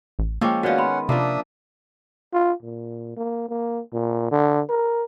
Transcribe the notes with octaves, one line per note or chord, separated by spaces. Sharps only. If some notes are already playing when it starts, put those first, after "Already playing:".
A1
F3 G#3 A#3 C#4 G5 D6 E6
D#3 B3 C#4 F#4 D5 F5 F#5
B5 C6
C3 F3 A#3 D4 E5 D#6
F4
A#2
A#3
A#3
A#2
D3
A#4